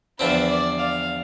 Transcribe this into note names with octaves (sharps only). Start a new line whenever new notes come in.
E2 D3 F3 C4 B4
D5
F5